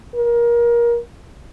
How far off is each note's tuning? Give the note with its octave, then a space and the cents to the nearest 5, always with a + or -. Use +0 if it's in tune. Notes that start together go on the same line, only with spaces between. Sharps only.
A#4 +25